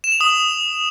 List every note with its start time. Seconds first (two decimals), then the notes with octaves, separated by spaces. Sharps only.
0.04 E7
0.12 F7
0.20 D#6 F#7